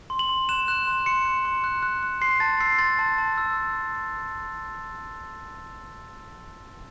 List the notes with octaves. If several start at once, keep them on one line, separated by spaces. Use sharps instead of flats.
C6
F#7
C6
F#6 E7
F#6
C6
C6 C#7
F#6
C6
F#6
F#6
F#6
C6 C7
A5 A6
E6 C7
C6 A6
A5
A5
E6